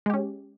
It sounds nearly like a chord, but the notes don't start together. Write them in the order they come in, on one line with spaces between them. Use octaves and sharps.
G#3 G4 C#4